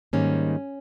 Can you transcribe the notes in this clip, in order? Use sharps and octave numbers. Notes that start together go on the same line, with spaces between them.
G#2 D#3 G3 A#3 C#4